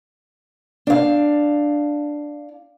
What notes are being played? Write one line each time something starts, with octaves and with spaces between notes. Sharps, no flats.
D4 F5